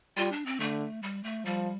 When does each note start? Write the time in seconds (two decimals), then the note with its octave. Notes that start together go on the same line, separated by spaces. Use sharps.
0.17 G3 F4
0.32 D4
0.46 C4
0.59 D3 A3
1.03 G3
1.24 A3
1.45 F3 G3